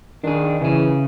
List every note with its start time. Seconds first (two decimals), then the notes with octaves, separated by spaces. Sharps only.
0.24 D#3 D4 G#4
0.61 C#3 E3 G#4